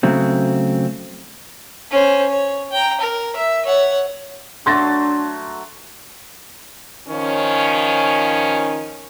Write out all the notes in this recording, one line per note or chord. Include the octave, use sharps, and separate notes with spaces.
C#3 F#3 A3 C4
C#4 C5
C#5
G5 A#5
A#4
E5
C#5 F#5
F#3 A3 D4 C6 A6 A#6
D#3 F3 C#4